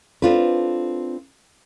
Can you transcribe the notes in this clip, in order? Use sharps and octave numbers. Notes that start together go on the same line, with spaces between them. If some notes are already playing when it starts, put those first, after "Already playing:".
C4 D4 F4 A4 B4